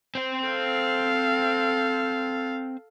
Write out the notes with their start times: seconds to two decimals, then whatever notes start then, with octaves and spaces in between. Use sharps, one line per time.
0.15 C4 C5
0.47 A4 F5